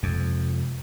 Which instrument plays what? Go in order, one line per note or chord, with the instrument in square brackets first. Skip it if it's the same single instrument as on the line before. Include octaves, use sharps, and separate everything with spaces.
[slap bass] F2 [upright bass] C3 G#3